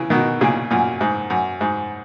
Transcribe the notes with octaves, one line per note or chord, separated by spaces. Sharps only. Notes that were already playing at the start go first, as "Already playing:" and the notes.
Already playing: C#3 E3
B2 D#3
A#2 C#3
F#2 A#2
G#2
F#2
G#2